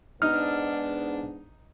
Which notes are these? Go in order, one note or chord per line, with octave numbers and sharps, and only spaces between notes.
G#2 B3 D4 D#4 F6